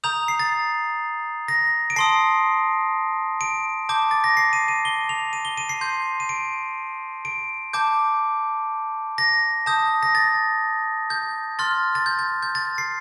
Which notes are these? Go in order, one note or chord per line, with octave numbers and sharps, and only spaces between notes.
A#5 D#6 G6 F7
C7
A6
A#6
D7
A5 C6 D#6 C7
D7
A5 D6 G6
A6
A#6
C7
D#7
D#7
G7
F7
D#7
G7
D#7
C7
C6 G6
D#7
D7
D7
A5 D6 G6
A#6
A5 D#6 G6
A#6
A6
G6
C6 F6 A6
A6
G6
G6
G6
A6
C7